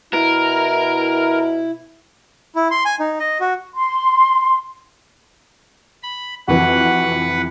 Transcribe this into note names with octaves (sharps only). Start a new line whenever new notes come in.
B2 E4 A#4
E4
C6
G#5
D#4
D#5
F#4
C6
B5
F2 C3 E3 F#4 B4 F#5